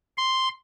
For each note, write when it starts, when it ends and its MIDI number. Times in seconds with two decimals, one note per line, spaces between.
0.18 0.49 84